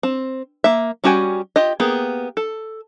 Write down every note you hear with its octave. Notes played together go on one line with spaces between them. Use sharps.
C4
A#3 E5
G3 C#4 F#4 G5 G#5
F4 G4 D#5
A#3 B3 G4 G#4
A4